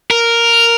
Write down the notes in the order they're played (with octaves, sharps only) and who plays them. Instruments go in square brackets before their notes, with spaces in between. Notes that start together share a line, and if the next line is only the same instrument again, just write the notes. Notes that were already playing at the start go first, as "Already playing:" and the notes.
[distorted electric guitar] A#4